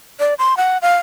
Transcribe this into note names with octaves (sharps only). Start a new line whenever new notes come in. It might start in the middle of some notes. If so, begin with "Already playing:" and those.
D5
C6
F#5
F5